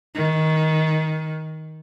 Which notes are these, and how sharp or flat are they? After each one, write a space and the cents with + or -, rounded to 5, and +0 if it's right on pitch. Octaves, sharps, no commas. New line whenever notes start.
D#3 +15